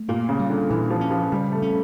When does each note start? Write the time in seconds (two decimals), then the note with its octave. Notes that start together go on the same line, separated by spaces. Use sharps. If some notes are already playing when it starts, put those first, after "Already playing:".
Already playing: A3
0.08 A#2 A#3
0.29 C#3
0.39 G3
0.50 D3
0.69 A#2 E3
0.90 F3
1.01 C#4
1.11 F3
1.32 C#3 G3
1.52 A3
1.62 C#4